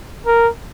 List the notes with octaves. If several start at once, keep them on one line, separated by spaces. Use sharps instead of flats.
A#4